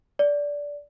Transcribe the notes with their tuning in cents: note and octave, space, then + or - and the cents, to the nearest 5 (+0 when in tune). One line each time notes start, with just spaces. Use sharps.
D5 -15